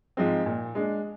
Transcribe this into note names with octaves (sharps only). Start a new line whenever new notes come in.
G#2 F3 G#3 C4
A#2
G#3 D4